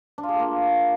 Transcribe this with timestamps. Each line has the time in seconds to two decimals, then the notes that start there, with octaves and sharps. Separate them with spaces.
0.18 D4
0.23 F4
0.29 G#4
0.34 A4
0.40 A#3